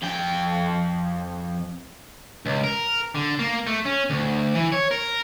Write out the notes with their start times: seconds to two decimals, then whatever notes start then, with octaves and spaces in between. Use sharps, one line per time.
0.03 F2 G5
2.46 C#2
2.64 A#4
3.15 D3
3.39 A#3
3.67 A3
3.86 C#4
4.10 D2
4.54 E3
4.72 C#5
4.91 A#4